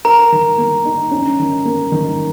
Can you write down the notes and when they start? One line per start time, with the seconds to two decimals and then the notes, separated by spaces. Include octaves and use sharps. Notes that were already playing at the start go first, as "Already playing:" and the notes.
0.05 A#4 A#5
0.32 D#3
0.58 A#3
0.85 D#4
1.11 C#4
1.39 D#3
1.65 A#3
1.92 D#3